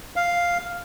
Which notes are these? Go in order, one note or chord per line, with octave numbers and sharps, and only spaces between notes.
F5